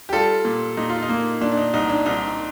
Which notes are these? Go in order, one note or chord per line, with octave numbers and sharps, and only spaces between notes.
G4
G3 F4 A4
A#2
A#2 D#4
F4
D#4
A#3
A#2 D4
D4
D#4
C2 D#4
D4
C2 D#4